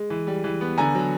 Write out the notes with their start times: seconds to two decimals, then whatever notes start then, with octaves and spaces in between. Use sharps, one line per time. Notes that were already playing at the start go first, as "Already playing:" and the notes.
Already playing: G#3
0.10 E3
0.27 G3
0.44 E3
0.61 B3
0.78 D3 G#5 A#5
0.95 F#3